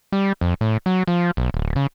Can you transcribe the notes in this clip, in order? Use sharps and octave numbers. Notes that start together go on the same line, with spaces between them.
G3
F2
A2
F#3
F3
B1
D1
C#3